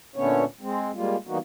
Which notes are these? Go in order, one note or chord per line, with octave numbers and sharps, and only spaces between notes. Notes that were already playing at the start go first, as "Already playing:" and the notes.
A#2 D3 A3 B3 C#4 C#5
G#3 C4
G3 G#3 A#3 F4
E3 G3 A#3 B3 D#4 F#4